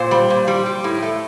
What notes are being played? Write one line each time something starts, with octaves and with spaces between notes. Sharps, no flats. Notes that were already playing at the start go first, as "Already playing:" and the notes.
Already playing: A#2 C5
G3
A#2
G3
G3
A2
A3